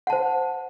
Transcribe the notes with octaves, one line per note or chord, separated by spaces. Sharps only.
C5 F#5 A5